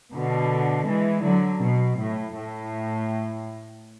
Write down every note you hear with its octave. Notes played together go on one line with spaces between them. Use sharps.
B2 D3
E3 G#3
D3 F#3
B2
A2
A2